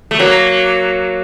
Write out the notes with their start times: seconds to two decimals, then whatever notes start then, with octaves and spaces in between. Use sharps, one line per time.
0.11 A3
0.19 F#3 A#3